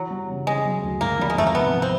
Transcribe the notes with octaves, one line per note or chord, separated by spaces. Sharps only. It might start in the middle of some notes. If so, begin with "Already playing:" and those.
Already playing: E3 F#3
G3
C#3
C#3 G#3
F#3
D2
G#2 A#3
F3 G3
G#3
G#1 A3
A#3
C3 B3
F3
C4